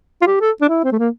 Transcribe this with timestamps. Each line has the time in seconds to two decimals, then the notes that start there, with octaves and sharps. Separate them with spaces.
0.22 F4
0.27 G4
0.41 A4
0.61 D4
0.70 E4
0.84 C4
0.92 A3
0.99 A#3